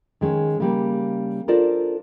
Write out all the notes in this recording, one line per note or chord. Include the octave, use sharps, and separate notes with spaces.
D#3 G#3 C#4
C#3 G3 A#3
D4 F4 A4 A#4 C5 D5